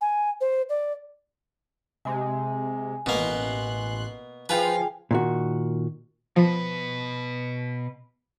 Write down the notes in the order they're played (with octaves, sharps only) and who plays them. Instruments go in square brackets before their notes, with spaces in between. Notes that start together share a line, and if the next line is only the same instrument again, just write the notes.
[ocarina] G#5
C5
D5
[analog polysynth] C3 G#3 [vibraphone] G#5
[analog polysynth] A1 C6 F#6 [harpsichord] B2 A#3
[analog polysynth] F3 F5 [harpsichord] F4 B4 [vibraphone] G#4 G5 G#5
[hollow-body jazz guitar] A#2 D#3 F#4
[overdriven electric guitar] B2 B4 [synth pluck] F3